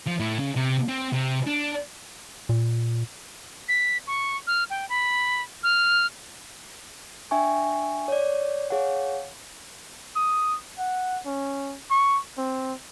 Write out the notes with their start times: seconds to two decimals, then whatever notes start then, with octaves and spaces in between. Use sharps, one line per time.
0.07 F3
0.20 A2
0.39 C#3
0.55 C3
0.88 C4
1.13 C3
1.47 D4
2.49 A#2
3.68 B6
4.07 C#6
4.47 F6
4.70 G5
4.89 B5
5.63 F6
7.31 D4 E5 G5 G#5 C#6
8.08 C#5 D5
8.70 G#4 C#5 F5 F#5
10.16 D#6
10.78 F#5
11.26 C#4
11.90 C#6
12.38 C4